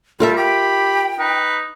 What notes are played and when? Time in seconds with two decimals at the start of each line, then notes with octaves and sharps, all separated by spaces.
0.20 G3 F4 A4 A#4 E5
0.37 G4 G5 B5
1.19 D#4 B4